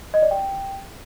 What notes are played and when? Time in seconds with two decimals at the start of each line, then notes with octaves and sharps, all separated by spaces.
0.14 D#5
0.22 D5
0.31 G5